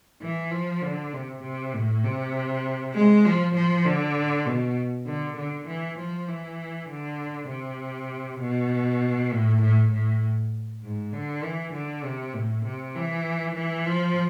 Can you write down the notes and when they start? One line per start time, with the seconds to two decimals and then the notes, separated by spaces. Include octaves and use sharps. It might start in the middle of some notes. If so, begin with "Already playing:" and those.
0.22 E3
0.51 F3
0.82 D3
1.13 C3
1.42 C3
1.74 A2
2.04 C3
2.94 G#3
3.25 F3
3.55 F3
3.85 D3
4.46 B2
5.06 D3
5.37 D3
5.68 E3
5.98 F3
6.28 E3
6.89 D3
7.50 C3
8.41 B2
9.32 A2
9.61 A2
9.92 A2
10.83 G#2
11.13 D3
11.44 E3
11.73 D3
12.05 C3
12.34 A2
12.65 C3
12.95 E3
13.55 E3
13.86 F3